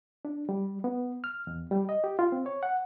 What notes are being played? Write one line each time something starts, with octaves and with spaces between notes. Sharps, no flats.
D4
G3
B3
F6
E2
G3
D#5
G4
F4
C4
C#5
F#5